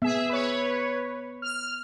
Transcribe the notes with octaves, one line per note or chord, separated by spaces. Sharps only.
B3 G#4 E5
B4 C#5
F6